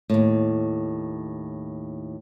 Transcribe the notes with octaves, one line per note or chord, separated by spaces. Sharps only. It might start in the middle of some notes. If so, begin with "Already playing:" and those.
D#2 A2